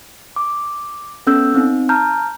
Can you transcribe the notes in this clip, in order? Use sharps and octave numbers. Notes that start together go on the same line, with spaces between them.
D6
B3 C#4 A4 E6 G6
C4 D#4
A5 A#5 F6 G6